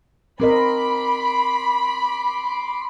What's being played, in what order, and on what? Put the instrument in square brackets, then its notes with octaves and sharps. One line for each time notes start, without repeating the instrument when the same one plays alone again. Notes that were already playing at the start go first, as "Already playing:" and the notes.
[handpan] C4 A#4 D#5 [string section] B5 [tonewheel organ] C6 D6